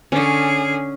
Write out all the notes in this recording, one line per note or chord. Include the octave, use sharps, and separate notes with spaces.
D3 C#4 G#4